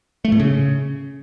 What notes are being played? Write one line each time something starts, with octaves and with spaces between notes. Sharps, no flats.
A3
A2
C#3